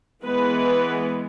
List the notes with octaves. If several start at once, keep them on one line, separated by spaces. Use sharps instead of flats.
E3 G#3 B3 B4